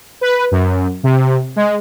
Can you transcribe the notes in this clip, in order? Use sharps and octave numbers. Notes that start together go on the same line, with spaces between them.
B4
F#2
C3
G#3